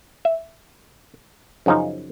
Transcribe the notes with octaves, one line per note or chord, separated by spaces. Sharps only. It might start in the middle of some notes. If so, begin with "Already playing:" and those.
E5
F#2 C#3 F3 C#4 D#4